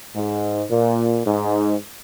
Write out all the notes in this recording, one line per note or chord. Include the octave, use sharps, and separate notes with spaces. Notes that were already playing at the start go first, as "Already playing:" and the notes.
G#2
A#2
G#2